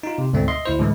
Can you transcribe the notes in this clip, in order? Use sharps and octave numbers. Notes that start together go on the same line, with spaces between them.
D#4 F4
C3
D2 G#2 B2 A3 C4
D#5 E5 C6
D2 E4 C5
A2 D3 E3 G#3